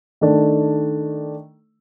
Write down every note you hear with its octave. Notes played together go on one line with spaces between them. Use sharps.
D#3 A3 D4